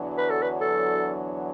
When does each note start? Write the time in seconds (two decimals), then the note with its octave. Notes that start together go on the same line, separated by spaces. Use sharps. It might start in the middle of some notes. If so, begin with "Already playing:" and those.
Already playing: E2 D3 F#3 D4
0.18 B4
0.30 A4
0.42 B4
0.61 A4